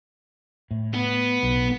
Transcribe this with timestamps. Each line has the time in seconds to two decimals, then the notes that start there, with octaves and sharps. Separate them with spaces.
0.71 A2
0.94 B3
1.43 B1